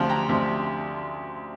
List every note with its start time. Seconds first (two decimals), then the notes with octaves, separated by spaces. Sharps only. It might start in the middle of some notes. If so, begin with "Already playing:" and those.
Already playing: D2 C3 F3 F5 A5
0.09 G5 A#5
0.29 D2 C3 F3